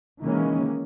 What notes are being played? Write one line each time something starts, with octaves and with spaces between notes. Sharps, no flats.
D#3 E3 G#3 A#3 C#4